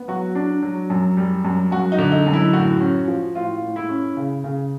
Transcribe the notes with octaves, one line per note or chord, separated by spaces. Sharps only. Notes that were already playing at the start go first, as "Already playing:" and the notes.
Already playing: B3
F#3 F#4
D4
F#3
F#2
G3
F#2
F#2 F#4
D#4
D3
D#4
F#2
E4
A2 F#4
C#4
F3
A2 F4
A2
E4
C#4
C#3
C#3